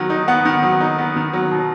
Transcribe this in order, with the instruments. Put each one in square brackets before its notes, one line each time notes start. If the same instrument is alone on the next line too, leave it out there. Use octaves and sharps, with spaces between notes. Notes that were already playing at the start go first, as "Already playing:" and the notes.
Already playing: [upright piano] D#3 F#3 B3
D#4
B3 F#5
D#3
F#3
D#4
B3
D#3
F#3
B2